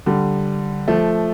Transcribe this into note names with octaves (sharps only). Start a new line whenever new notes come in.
D3 G3
F3 A3